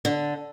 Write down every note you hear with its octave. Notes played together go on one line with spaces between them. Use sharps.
D3